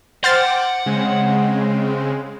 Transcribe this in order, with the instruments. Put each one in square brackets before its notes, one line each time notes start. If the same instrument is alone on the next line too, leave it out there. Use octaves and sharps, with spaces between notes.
[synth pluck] C5 F6 A6 [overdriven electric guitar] F#5 [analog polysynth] G5 D6
[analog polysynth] C#3 G#3 C4